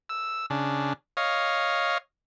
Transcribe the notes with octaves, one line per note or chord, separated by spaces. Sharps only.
E6
C#3 D4
C#5 D#5 F5